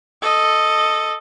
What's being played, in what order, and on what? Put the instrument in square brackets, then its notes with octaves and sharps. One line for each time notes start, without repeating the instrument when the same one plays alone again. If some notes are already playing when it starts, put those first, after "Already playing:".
[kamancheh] A4 D#5